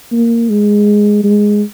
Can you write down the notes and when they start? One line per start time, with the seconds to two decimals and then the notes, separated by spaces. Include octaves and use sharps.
0.12 A#3
0.50 G#3
1.24 G#3